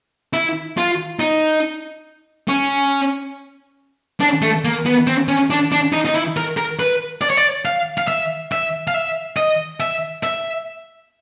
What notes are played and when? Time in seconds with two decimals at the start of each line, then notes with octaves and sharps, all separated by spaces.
0.33 E4
0.77 F4
1.20 D#4
2.48 C#4
4.20 D4
4.42 A3
4.65 A#3
4.86 B3
5.07 C4
5.28 C#4
5.50 D4
5.72 D4
5.93 D#4
6.05 D#4
6.15 E4
6.37 A#4
6.57 A#4
6.80 B4
7.22 D5
7.30 C#5
7.37 D5
7.65 F5
7.98 F5
8.08 E5
8.52 E5
8.88 F5
8.94 E5
9.37 D#5
9.80 E5
10.23 E5